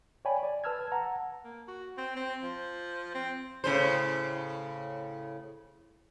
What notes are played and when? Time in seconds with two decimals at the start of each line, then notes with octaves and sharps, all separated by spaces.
0.25 C#5 D5 G5 G#5 B5
0.43 D5
0.64 B4 A5 E6 F6 G#6
0.92 F#5 A5 A#5
1.44 A#3
1.68 F#4
1.98 C4
2.16 C4
2.43 F3
3.14 C4
3.64 A2 C#3 C5